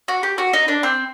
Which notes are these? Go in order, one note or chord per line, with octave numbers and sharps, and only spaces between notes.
F#4
G4
F#4
D#4
D4
C4